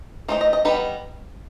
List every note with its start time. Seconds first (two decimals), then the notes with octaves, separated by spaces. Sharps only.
0.28 E3 A3 D#4 C5
0.41 D#5
0.53 D#5
0.65 G3 B3 D#4 B4